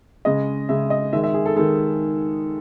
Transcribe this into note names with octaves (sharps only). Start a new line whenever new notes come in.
C#3 G#3 D#5
C#3 G#3 E5
D#5
D#3 G#3 E5
E5
G#4
A4
D#3 G#3 A4